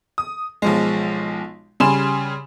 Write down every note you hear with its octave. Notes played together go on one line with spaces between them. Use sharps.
D#6
B1 F3 G#3
C#3 G3 G#5 B5 C6 E7